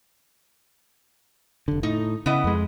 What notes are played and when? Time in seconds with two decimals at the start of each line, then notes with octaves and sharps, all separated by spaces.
1.68 F1 D3
1.83 A2 D#4
2.26 C#3 B3 E4 D#5
2.44 F2 G#3